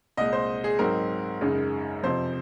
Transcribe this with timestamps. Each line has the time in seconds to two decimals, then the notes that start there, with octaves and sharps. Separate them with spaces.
0.17 C2 A#2 G#3 D#5
0.33 C5
0.64 G#4
0.79 G#2 F#3 C4 D#4 A#4
1.41 F#2 C#3 G#3 D#4
2.03 F2 C3 F3 C5